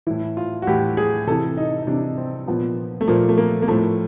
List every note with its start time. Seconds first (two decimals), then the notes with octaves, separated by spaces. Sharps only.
0.07 A2 E3 E4
0.37 F4
0.62 F#4
0.67 A2 E3 G4
0.97 G#4
1.27 C3 E3 A4
1.57 D#4
1.83 D#4
1.87 C3 E3 D4
2.18 C4
2.47 A#2 F3 B3
3.01 A3
3.08 A#2 F3 A#3
3.29 A3
3.38 A#3
3.62 A#3
3.68 A2 F3 A3